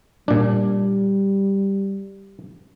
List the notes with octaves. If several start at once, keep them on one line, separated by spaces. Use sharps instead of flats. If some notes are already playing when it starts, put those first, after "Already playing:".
A#2 G3 D4